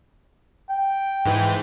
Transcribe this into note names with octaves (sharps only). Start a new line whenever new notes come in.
G5
G#2 E3